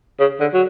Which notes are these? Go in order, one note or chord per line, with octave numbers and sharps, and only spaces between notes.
C#3
D3
F#3